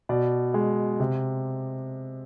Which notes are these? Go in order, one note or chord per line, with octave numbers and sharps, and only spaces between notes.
B2 D5
G#3
C3